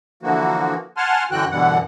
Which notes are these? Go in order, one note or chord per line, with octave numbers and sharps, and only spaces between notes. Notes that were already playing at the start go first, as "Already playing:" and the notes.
D3 E3 F3 A#3 F#4
F#5 G#5 A5 C6 F6
F#2 D3 E3 F#4 G5 F#6
F#2 B2 D3 E3 G3 F#5